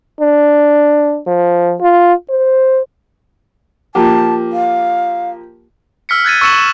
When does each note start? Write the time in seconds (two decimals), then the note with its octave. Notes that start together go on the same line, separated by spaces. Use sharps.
0.21 D4
1.27 F3
1.81 F4
2.30 C5
3.95 F3 A#3 G4 A5
4.52 F5
6.09 E6 F6 B6 C#7
6.25 F#6 G#6 A6 D#7
6.41 C#6 E6 A6 C#7 E7 F#7
6.58 E7